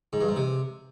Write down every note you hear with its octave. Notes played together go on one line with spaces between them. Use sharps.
G#2
G2
G#2
C3